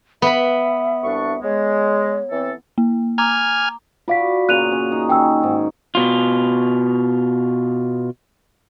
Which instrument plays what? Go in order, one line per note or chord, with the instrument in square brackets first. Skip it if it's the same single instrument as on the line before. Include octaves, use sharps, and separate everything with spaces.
[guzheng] B3 B5 [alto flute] E5
[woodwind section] C2 D4 C#6
[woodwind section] G#3 [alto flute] C#5
[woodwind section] E3 C4 A4
[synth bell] A#3
[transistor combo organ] G#5 F6 [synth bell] A#5 D6
[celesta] F4 F5 B6 [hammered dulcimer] F#4 D5 B5
[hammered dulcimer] A#2 C#3 [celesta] F#6 D#7 F7
[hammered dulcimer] C#4
D#4
[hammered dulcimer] D#3 C#4 [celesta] G5 G#5 E6
[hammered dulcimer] G#2
[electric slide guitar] B2 F4